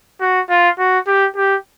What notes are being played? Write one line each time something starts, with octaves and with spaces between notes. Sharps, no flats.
F#4
F4
F#4
G4
G4